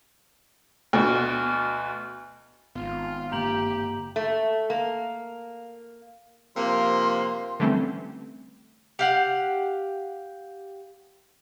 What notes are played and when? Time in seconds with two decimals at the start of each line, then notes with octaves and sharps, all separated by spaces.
0.93 D2 B2
2.76 G#1 B3 F4
3.32 G2 D3 A#3 G4 A#5 G6 F#7
4.16 A3
4.70 A#3
6.57 C3 F3 A#3 C6
7.60 D3 E3 G3 A3 C4 C#4
8.99 G4 F5 F#5